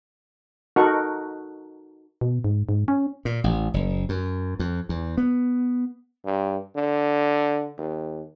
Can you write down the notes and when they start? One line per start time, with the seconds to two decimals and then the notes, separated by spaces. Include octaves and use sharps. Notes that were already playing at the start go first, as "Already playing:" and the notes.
0.76 D#4 F#4 A4 A#4 F#5 C#6
2.21 B2
2.44 G#2
2.69 G#2
2.88 C#4
3.25 A#2
3.44 A1
3.74 F#1
4.09 F#2
4.59 F2
4.89 E2
5.17 B3
6.25 G2
6.76 D3
7.78 D#2